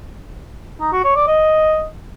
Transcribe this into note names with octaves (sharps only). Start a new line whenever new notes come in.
D#4
F#4
C#5
D5
D#5